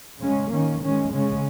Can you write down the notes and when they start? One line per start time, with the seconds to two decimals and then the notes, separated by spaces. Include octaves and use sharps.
0.20 C#3 G#3 C#4
0.50 D#3 A#3 C#4
0.80 D#3 G#3 C#4
1.10 C#3 G#3 C#4